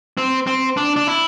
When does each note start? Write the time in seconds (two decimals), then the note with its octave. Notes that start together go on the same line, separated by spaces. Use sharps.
0.18 C4
0.47 C4
0.77 D4
0.96 D4
1.07 E4